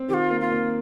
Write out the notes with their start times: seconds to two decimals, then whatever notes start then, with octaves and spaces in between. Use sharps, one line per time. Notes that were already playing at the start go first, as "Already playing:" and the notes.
Already playing: C4
0.08 D#3 G4
0.14 F4
0.30 A#3
0.40 F4
0.51 A#3